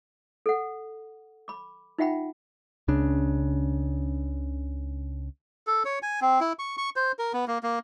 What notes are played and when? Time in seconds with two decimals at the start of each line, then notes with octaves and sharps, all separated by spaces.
0.46 A4 F#5
1.48 B5 D6
1.98 D#4 F4 E5 F#5 G5 B5
2.88 C#2 C#3 D4
5.67 A4
5.85 C#5
6.02 G#5
6.21 C4
6.41 E4
6.59 C#6
6.78 C#6
6.96 C5
7.19 A#4
7.33 B3
7.47 A#3
7.63 A#3